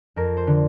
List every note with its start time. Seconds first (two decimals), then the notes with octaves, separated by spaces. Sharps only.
0.16 F2 A#4
0.37 C5
0.47 D3